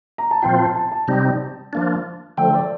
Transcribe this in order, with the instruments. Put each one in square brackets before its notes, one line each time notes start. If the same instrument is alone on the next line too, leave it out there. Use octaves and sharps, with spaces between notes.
[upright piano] A#5
A5
[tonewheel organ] A#2 F3 C4 F4 [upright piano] G5
[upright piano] A5
A5
A5
[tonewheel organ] C3 G3 C4 D#4
F3 A#3 D4
[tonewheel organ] D3 F3 A3 [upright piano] G5
[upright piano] D5